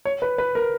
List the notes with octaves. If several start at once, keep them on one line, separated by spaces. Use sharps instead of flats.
C#5
B4
B4
A#4